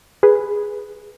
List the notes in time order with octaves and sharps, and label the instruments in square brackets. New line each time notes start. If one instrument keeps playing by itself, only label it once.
[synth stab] G#4 B4